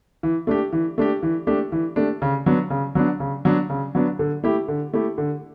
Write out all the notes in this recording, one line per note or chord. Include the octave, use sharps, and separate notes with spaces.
E3
A3 D4 G4
E3
A3 D4 G4
E3
A3 D4 G4
E3
A3 D4 G4
C#3
F#3 B3 D4
C#3
F#3 B3 D4
C#3
F#3 B3 D4
C#3
F#3 B3 D4
D3
A3 E4 G4
D3
A3 E4 G4
D3